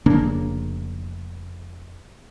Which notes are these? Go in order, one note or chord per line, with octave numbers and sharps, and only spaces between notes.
F1 C#3 A#3 D4